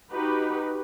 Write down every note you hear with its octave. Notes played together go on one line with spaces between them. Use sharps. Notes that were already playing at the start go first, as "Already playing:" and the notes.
D#4 F#4 G4 B4